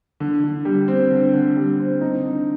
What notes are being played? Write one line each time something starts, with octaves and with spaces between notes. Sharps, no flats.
D3
D3
G3
C4
D3
D3
G3
C4
D#4
D3